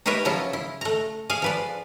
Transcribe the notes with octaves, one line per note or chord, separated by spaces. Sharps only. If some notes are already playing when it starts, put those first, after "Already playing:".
D#4 G4 A#4 B4 C#5 E5
C#3 F3 F#3 E4 F4
E4
A3 A#5
G#4 F5 G#5
F3 B4 D5